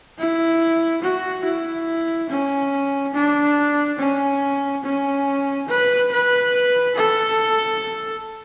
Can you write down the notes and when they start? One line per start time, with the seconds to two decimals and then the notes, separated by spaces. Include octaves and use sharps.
0.19 E4
1.03 F#4
1.45 E4
2.30 C#4
3.15 D4
3.99 C#4
4.84 C#4
5.69 B4
6.12 B4
6.96 A4